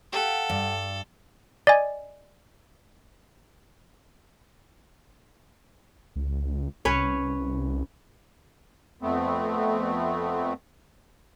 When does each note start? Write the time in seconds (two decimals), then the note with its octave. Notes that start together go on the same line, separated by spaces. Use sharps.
0.13 G4 A4 F5 F#5
0.49 G2
1.67 D5 D#5 G#5
6.16 C#2
6.85 C2 C#4 B4 C#5
9.02 F2 A3 B3 C4